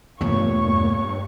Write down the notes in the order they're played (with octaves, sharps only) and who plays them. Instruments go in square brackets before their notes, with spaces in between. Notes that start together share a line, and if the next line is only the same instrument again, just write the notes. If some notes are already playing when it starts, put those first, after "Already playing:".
[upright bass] E2 F4 [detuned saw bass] G2 [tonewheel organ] B2 A3 A#3 [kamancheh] C#5 C#6